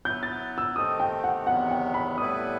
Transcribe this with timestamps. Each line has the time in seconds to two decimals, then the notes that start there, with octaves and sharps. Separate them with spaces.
0.05 F#3 B3 E4 B4 G6
0.23 A6
0.58 E6
0.76 D#3 A3 C4 D#4 G4 D#6
1.00 G5
1.24 F#5
1.47 E2 C3 D#3 F#3 B3 F#5
1.71 G5
1.94 B5
2.18 A2 G3 B3 E4 B4 D#6